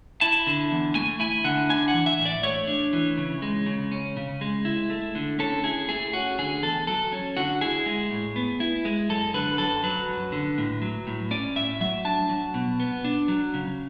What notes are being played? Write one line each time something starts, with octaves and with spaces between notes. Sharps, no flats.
E4 A5
D3
E2
A3 G#5
E4 G#5
D3 F#5
D4 G#5
F#5
E3
E5
A2
D5
A3 C#5
D4
E3
C#3
G#3
C#3
C#4
C#3
G#3
E4
A3
D3
C#4 A4
E4 G#4
A3 G#4
C#4 F#4
D3 G#4
E2 A4
F#3 A4
C#4
D3 F#4
E4 G#4
G#3
A2
B3
E4
G#3
F#2 A4
D3 B4
F#2 A4
F#3 B4
F#2
D3
A2
F#3
A2
C#4 D5
A2 E5
F#3 E5
D4 A5
F#3
B2
B3
D4
F#3
C#3